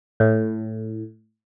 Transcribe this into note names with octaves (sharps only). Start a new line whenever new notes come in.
A2